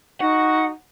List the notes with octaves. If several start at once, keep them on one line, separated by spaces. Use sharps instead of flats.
D#4 F#4 F#5